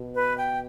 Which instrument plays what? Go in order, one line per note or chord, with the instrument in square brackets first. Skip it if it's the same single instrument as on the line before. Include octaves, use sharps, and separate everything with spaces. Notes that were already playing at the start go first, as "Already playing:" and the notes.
Already playing: [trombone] B2
[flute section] B4
G5